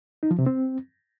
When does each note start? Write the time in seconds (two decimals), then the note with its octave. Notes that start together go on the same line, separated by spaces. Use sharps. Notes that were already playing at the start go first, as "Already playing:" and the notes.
0.23 D#4
0.31 F3
0.39 C3
0.46 C4